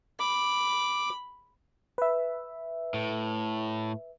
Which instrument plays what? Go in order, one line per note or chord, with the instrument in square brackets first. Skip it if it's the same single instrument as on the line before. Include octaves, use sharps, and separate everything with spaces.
[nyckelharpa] B5 [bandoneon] D6
[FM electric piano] B4 E5
[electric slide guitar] A2